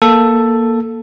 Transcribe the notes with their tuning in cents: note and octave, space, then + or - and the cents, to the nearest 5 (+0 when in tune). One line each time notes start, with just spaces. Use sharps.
A#3 +5 A4 +5